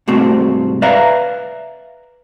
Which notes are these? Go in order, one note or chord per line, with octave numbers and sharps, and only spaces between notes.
C2 G#2 A3 C4 F#4
B4 D5 E5 F5 A#5